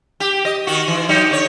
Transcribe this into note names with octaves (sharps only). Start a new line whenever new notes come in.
G4
D#5
D#3 F#4
E3
F#3 D#4 G4
D3 C#5